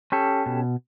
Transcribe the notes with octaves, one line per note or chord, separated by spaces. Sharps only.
C#4 G4 A4
B2